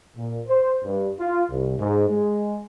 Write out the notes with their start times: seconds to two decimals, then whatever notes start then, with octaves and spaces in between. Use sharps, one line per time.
0.17 A#2
0.48 C5
0.84 G2
1.19 F4
1.50 C2
1.78 G#2
2.09 G#3